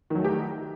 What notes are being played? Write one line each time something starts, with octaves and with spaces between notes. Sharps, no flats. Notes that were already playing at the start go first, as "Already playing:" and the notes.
D#3 F#3 A3 D#4 G4